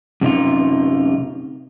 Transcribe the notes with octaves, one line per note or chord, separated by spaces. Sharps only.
F#2 C3 D#4 F4